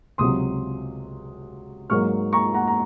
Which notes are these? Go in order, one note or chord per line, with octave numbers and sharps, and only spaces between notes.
C#2 C3 F#3 C6 D#6
G#2 F#3 A#3 C#6 F6
A#5 C#6
F#5 A#5
A#5